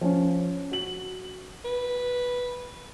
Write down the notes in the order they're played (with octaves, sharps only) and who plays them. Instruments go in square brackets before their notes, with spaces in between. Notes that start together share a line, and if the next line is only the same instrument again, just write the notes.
[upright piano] F3 C#4
F#4 F#7
[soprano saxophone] B4